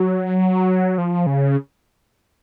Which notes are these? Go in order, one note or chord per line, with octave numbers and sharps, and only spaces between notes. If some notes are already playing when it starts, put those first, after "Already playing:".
Already playing: F#3
F3
C#3